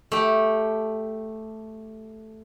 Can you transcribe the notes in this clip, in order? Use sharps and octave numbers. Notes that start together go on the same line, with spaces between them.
A3 G4